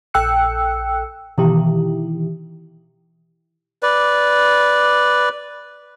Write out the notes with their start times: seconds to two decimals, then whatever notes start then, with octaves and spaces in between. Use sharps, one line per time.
0.14 A#1 A4 G5 E6 F#6 C#7
1.38 B2 D#3 E3 E4 G4
3.83 B4 D5